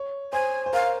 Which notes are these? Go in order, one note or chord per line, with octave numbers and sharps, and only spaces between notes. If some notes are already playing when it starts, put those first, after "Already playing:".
Already playing: C#5
C5 G#5
C5
A#4 F5